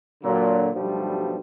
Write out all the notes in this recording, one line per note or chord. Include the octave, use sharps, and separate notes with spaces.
A#2 D3 F#3
B1 G2 B2 F3 G3 A3